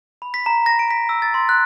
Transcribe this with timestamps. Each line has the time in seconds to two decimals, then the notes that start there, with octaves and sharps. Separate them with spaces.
0.22 B5
0.34 B6
0.46 A#5
0.66 A#6
0.79 D7
0.91 B6
1.09 E6
1.22 A6
1.34 C6
1.49 F#6